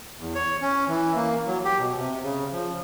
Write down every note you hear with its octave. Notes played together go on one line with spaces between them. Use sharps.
E2
C#5
C#4
E3
A#3
F#3
G4
B2
C3
C#3
F3